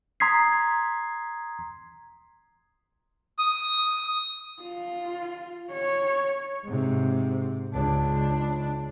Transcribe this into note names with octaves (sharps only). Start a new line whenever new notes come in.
A#5 C6 D#6 G#6 B6 C7
D#6
F4
C#5
G#2 C3
C#2 D4